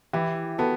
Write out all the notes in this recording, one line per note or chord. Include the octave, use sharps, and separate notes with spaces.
E3 E4 G4
B3 F#4 A4